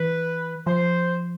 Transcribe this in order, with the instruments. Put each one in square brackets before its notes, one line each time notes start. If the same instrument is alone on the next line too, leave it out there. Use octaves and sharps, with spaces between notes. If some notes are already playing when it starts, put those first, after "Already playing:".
Already playing: [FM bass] E3 [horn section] B4
[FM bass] F3 [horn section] C5